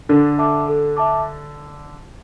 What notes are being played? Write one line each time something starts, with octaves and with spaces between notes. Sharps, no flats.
D3 D4 A4
E5 A5 D6
A4
E5 A5 D6